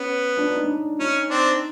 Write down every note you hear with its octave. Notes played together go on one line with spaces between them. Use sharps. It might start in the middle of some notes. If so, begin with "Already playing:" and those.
Already playing: B3 C#4
D4
D#4
D4
C#4 D#4
C4 D4